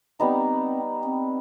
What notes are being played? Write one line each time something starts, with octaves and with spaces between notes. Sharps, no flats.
G3 B3 C4 D#4
C4